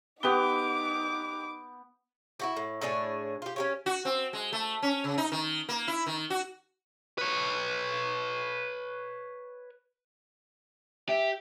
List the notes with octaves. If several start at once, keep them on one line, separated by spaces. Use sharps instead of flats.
B3 D#4 G4 F#5 D6 D#6 G7
E4 F#4 G4
A2
A2 D4 G#4 C#5
F4 G4
C#4 G4 C#5
F#4
C4
G#3
A3
C#4
C#3
D#4
D#3
A#3
E4
D#3
F#4
B4 C#5
G4 E5